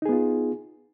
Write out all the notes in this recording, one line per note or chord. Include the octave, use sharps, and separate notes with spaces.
B3 D#4 F4 G#4